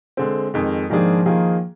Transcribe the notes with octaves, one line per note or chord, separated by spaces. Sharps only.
D3 G#3 C4
F2 D#3 G#3
G#2 D#3 F3 A#3 D4 G#4
D#3 A#3 F4 G#4